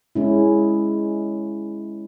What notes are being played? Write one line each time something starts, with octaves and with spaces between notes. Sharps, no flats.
G#3 C#4 E4